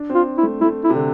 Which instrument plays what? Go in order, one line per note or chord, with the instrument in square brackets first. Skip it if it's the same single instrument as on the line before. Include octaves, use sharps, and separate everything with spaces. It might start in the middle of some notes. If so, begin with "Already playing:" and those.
Already playing: [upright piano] D4
C4
[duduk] F4
E4
[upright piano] A3
[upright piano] A3 [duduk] E4
[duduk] E4
[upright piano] C3
D3